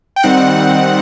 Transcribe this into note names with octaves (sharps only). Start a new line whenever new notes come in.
G5
D#3 G3 C4 D#4 F#5